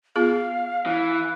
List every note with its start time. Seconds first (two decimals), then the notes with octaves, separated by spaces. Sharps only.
0.16 B3 F4 G#4 F5
0.86 E3